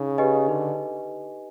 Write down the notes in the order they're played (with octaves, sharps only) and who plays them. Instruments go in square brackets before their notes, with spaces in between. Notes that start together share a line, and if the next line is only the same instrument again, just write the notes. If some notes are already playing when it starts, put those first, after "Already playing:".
Already playing: [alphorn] C#3 [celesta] D#4
[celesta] G4 B4 D#5 G#5
[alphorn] D3 [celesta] D#4